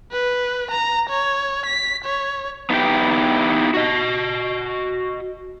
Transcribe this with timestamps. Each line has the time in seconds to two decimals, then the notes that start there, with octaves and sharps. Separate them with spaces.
0.12 B4
0.71 A#5
1.10 C#5
1.66 B6
2.05 C#5
2.70 B3 D#4 E4 G4 G5
3.74 F#4 D#5